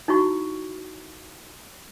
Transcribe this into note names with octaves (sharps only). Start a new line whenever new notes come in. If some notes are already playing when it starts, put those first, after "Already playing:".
D#4 E4 F#4 C#6